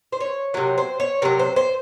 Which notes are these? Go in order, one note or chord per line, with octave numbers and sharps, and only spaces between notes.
C5
C#5
C3 F#3 A#4
C5
C#5
C3 F#3 A#4
C5
C5